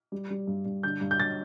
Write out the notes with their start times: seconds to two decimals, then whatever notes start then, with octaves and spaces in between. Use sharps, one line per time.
0.12 G3
0.30 G3
0.47 G2
0.65 G2
0.83 D3 G6
1.01 G2
1.11 G6
1.19 G2 A6